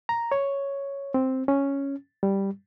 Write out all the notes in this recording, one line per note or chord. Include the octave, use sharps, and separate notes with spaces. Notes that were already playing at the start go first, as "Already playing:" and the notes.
A#5
C#5
C4
C#4
G3